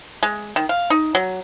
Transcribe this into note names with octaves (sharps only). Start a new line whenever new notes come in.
G#3
D#3
F5
D#4
F#3